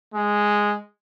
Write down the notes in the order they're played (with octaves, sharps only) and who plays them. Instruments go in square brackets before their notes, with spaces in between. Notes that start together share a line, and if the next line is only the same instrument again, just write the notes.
[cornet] G#3